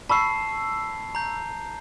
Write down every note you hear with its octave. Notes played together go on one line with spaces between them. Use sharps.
A5 B5 C#6 E6 C7
A#5 G6